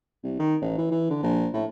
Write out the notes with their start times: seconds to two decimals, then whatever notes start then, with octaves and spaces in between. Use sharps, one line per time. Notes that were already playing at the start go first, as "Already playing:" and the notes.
0.24 C2
0.40 D#3
0.62 A1
0.78 E3
0.91 E3
1.10 D3
1.23 A#1
1.53 A2